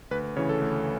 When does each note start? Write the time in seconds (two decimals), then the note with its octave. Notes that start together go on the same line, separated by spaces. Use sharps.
0.11 D2 B4
0.36 C#3 E3 C#5
0.49 A4
0.62 D2